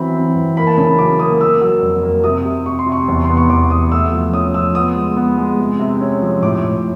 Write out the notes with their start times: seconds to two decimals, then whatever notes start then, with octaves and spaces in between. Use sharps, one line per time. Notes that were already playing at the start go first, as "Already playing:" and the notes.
Already playing: E3 F#3 C4 B5
0.15 C4
0.36 E3
0.57 A#3 B5
0.67 A5
0.78 C#3 B5
0.98 F#3 D6
1.19 A#3 D#6
1.40 A#3 E6
1.61 F#3 E6
1.82 F2
2.03 A#3
2.24 C3 D#6
2.45 C3
2.66 C3 C#6
2.79 C6
2.87 C3
2.92 C#6
3.08 E2
3.24 B3 C6
3.37 C#6
3.49 E2 D6
3.70 B3 D#6
3.92 A3 E6
4.12 F3
4.33 C#4 D#6
4.54 F3 E6
4.75 B3 D#6
4.96 G#3
5.17 B3
5.38 G#3
5.59 C3
5.80 C3
6.01 C#4
6.22 F3
6.43 A2 D6
6.64 A2